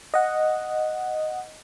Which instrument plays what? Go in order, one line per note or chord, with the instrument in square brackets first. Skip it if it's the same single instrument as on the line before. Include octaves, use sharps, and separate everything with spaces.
[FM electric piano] D#5 F#5